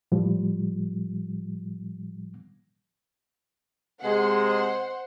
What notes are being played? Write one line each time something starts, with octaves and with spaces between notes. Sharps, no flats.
A2 F3 G3
C3 G#3 C5 F#5